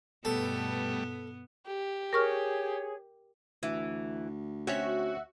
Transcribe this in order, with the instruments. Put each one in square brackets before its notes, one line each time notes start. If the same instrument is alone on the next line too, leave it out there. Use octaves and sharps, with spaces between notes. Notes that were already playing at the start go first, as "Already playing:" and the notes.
[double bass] G2 B2 [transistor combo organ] G3 A3 [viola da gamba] B3 [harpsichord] A4
[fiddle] G4
[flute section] G#4 C#5 [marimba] A#4 C#6 F6
[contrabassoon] D2 [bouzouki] E3
[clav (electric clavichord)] C4 C#4 C#5 [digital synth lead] F#4 [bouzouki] E5